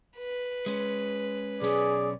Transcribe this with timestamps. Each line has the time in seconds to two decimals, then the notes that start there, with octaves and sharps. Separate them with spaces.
0.17 B4
0.66 G#3 C#4
1.62 B1 C#4 G#4 D5